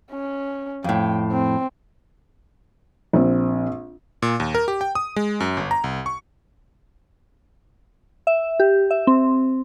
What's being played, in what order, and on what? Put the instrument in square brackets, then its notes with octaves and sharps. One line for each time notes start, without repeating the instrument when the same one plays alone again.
[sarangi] C#4
[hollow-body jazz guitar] F2 A2 [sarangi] G5
[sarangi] C4
[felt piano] A#1 C4
[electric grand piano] A#2
D#2
A#4
G4
G5
D#6
G#3
F#2
G1
A#5
C2
C#6
[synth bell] E5
G4
E5
C4